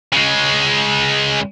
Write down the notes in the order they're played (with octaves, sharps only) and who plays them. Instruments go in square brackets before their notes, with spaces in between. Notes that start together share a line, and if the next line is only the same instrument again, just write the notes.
[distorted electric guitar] C#3 G#3